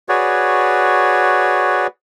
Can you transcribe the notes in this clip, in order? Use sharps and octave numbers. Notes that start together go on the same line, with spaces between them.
F#4 G#4 B4 C#5 D5